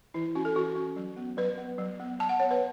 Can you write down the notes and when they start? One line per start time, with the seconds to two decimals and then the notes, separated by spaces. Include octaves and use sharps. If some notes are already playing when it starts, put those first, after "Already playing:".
0.14 E3 E4
0.35 C#4 F#4
0.45 A4
0.56 E3 F#4
0.76 C#4
0.96 F#3
1.16 B3
1.37 F#3 B4
1.58 B3
1.78 F#3
2.00 B3
2.19 F#3 A5
2.29 F#5
2.40 B3 C#5
2.51 B4